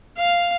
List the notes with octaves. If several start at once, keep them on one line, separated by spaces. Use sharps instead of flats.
F5